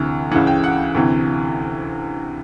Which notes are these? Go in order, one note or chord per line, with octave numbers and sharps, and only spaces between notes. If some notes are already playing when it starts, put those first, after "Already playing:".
Already playing: D2 C3 E3
C#2 C#3 E3 F#5
G5
F#5
D2 C3 E3